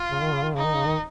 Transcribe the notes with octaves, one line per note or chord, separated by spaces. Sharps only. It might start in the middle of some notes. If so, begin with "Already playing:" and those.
Already playing: F4
C#3
D#3
C#3
D#3
C#3 D#4
D#3
C#3
D#3